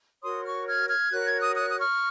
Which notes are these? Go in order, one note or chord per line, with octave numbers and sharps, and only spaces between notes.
F#4 A#4 C#5 C6 D#6
C#6 F6
F6 G#6
F6 G#6
F#4 A#4 C#5 F#6
G#6
D#6 F#6
D#6 F#6
D#6
C#6 F6